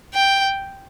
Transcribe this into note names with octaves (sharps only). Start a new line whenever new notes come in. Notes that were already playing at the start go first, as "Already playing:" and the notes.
G5